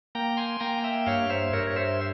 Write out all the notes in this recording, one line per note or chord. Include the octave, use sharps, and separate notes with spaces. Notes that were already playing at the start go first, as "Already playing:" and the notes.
A#3 G5 A#5
G#5 C6
A#3 G5 A#5
E5 G5
G2 C#5 F5
C5 E5
G2 A#4 C#5
C#5
C5 E5